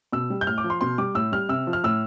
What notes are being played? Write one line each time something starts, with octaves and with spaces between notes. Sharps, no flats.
B2 E6
G3
G6
A2 F6
D6
F3
C6
B2 C6
G3 D6
A2 E6
G3 F6
C3 E6
F3
F6
A2 E6